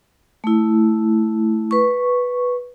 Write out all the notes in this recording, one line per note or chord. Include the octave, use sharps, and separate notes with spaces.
A3 E4
B4 C#6